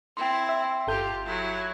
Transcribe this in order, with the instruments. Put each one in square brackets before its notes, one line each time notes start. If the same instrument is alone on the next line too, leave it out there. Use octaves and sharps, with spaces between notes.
[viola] C4 E4 [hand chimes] G5 C6
[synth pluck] E5
[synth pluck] G1 A4 G6 [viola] F4 G4
[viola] F#3 E4